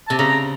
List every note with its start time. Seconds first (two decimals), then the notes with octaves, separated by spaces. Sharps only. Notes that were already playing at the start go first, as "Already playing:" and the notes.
0.08 C3 A5
0.19 C#3 A#5